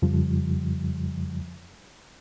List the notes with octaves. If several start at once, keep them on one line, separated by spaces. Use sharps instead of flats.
F2 C#3 F3 G3